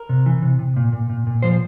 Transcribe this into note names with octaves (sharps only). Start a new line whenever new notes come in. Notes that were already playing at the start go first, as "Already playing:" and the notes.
Already playing: A#4
C3
E3
C3
C3
A#2
A#2
A#2
A#2
F3 C5